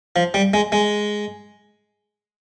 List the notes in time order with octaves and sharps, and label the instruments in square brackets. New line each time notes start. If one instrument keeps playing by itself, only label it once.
[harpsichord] F3
G3
G#3
G#3